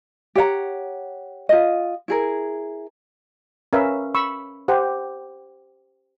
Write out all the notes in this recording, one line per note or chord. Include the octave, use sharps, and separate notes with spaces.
G4 C#5 F#5 A#5
F4 D#5
E4 G#4 A#4
C#4 A#4 B4 E5 F5
B5 C#6 E6
G4 C5 F#5